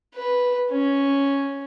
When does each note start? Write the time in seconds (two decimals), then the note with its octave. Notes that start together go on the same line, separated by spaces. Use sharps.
0.15 B4
0.71 C#4